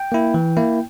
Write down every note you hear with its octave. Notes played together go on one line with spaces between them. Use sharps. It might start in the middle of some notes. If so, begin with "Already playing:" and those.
Already playing: G5
A#3 E4
E3
A#3 E4